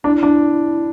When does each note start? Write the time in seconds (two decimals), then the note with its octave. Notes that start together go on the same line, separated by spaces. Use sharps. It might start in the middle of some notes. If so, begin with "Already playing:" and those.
0.04 D4 E4
0.23 D4